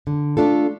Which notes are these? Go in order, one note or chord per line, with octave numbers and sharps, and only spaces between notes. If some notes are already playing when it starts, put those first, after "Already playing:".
D3
A3 D4 F4 A4